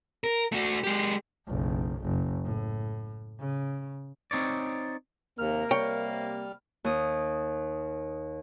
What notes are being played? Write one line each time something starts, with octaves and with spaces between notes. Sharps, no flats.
A#4
A3 F#4
G#3 G4
F#1 B1
F#1
A2
C#3
C4 D#4 C#5 D5
D#2 C3 A#3 A#4 F6
G3 C#5 G5 F6
D#2 D#6